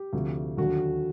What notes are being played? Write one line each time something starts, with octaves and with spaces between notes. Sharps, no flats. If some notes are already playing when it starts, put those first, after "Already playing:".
Already playing: G4
D2 C3 F3
D#2 D3 F#3 F#4